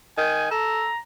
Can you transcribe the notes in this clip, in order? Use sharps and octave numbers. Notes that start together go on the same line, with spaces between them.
D#3 G#5
A4 A#5